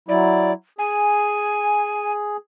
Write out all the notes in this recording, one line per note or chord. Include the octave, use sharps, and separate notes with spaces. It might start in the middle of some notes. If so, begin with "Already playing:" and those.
F#3 E4 D5
G#4 G#5